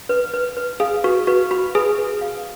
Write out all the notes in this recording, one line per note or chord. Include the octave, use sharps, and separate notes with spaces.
B4
B4
B4
G#4 F5
F#4 B4
F#4 B4
F#4 B5
G#4 B4
B4
F5